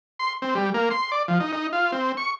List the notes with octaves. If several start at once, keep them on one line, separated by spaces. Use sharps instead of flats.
C6
C4
G3
A#3
C6
D5
F3
D#4
D#4
F4
C4
C#6